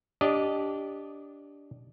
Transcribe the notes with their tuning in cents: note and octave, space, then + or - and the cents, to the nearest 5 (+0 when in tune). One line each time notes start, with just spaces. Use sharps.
D4 -20 G4 +0 D#5 -10